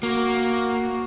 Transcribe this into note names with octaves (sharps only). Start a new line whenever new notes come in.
A#3 F#4